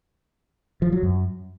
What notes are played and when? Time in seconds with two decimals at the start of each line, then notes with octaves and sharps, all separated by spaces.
0.82 F3
0.92 F#3
1.03 F#2